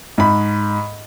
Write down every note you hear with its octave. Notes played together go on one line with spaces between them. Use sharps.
G#2 B5